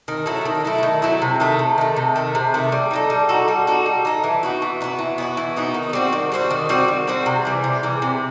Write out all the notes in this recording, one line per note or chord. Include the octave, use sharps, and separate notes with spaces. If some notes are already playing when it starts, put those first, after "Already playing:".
D#3
F#3 A3 E4
D#3
F#3 A3 E4
D#3
F#3 A3 E4
C3
D#3 A3
C3
D#3 A3
C3
D#3 A3
C3
D#3 A3
G3
D#4 F#4 A4
G3
D#4 F#4 A4
G3
D#4 F#4 A4
G3
D#4 F#4 A4
E3
B3 D#4 F#4
E3
B3 D#4 F#4
E3
B3 D#4 F#4
E3
B3 D#4 F#4
D#3
G3 C4 F#4
D#3
G3 C4 F#4
D#3
G3 C4 F#4
D#3
G3 C4 F#4
C3
E3 G3
C3
E3 G3
C3